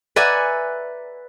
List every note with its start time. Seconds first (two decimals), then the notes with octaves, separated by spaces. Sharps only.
0.16 B4 D5 E5 F#5 G#5 A#5